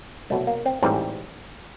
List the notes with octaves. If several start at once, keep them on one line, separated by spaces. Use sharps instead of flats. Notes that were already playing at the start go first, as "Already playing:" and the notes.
C2 B2 F#3 A3
A#3
C4
A1 G#2 E3 G3 C4